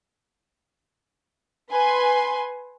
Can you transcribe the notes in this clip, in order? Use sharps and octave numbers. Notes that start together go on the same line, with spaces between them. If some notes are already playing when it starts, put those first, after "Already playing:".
B4 G#5 C6